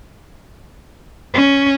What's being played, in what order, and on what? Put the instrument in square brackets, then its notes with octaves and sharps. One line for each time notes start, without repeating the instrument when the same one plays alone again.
[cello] C#4